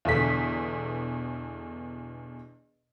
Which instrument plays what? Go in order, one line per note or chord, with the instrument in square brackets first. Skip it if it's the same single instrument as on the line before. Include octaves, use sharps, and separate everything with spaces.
[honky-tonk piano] E2 B2 D3 B6